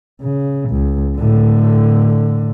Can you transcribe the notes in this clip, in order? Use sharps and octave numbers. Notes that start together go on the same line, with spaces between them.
C#3
C#2
A2 D3